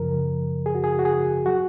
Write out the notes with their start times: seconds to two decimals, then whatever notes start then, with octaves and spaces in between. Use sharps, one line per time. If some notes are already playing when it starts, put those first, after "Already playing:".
Already playing: F#2 C#3 F3 A#4
0.66 G#4
0.75 F#4
0.84 G#4
0.99 F#4
1.05 G#4
1.46 F#3 F#4